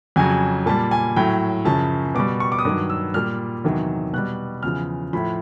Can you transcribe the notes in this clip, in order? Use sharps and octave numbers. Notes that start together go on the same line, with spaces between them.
F2 C#3 F#3 G#5
A#2 G3 A5
G#5
A2 F#3 G5
F#2 C#3 F3 A5
B2 D6
G3
C#6
D6
D#6
G2 D#3 F#3 D6
E6
A#2 G3 F6
E2 C3 D#3 F#3
B2 G3 F#6
E2 C#3 F3 F6
A2 F3 B5